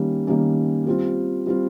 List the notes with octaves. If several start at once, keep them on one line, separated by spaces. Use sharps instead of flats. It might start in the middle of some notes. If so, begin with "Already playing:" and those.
Already playing: D#3 G3 A#3 C#4
D#3 G3 A#3 C#4
G3 C4 F4
G3 C4 F4